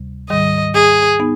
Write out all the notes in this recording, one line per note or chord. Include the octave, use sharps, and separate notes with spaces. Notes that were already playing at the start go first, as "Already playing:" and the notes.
Already playing: D2 C3 G3
G#2 D#3 G3 D#5
G#4
B3 D#4